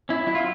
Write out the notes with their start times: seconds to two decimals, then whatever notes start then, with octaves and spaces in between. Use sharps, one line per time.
0.09 C#4 E4
0.27 F#3 E4
0.35 F4